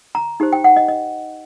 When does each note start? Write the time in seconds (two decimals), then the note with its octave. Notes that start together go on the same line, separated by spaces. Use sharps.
0.15 A#5
0.40 D#4 G4 C5
0.53 G5
0.64 F#5
0.77 D#5
0.88 D#5